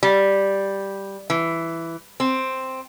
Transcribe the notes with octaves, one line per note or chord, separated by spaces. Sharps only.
G3
E3
C4